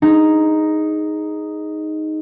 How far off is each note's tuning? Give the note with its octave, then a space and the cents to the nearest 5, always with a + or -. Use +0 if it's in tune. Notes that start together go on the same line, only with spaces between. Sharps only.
D#4 +0 G#4 +0